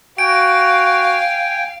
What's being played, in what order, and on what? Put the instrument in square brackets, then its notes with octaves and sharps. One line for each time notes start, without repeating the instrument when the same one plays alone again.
[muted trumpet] F#4 [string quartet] F5 [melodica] G5 G#5 [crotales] D7